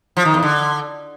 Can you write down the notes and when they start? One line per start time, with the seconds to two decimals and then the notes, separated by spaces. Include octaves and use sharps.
0.17 F3
0.25 D#3
0.34 E2
0.43 D3